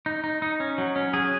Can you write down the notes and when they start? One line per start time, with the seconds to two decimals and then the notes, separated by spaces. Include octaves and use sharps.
0.06 D#4
0.24 D#4
0.42 D#4
0.60 C#4
0.78 F#3
0.96 C#4
1.13 F#3 G#4